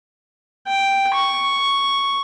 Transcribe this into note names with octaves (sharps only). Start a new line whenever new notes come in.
G5
C#6